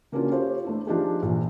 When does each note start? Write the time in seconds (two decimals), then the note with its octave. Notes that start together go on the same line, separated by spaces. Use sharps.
0.12 C#3 A#3 C#4 D4 F4 F#4
0.31 F4 G4 A4 C5 C#5 F5
0.65 A3 D4 E4
0.87 F3 D4 D#4 F4 G4 G#4
1.22 A#1 E3